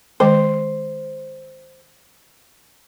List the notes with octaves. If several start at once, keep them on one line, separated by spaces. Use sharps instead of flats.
D#3 G#3 C5 G5